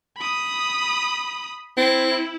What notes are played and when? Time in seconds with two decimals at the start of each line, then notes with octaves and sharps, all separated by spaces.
0.17 B5 D#6
1.77 C4 E4